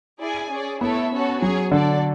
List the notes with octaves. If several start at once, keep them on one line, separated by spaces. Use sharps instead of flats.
E4 G#4 D5 G#5
C#4 G#4 D5
A3 B3 E4 A4 C#5 E5
C#4 F#4 A4 C#5
F#3 C#4 G#4 C#5
D3 D4 A4 D5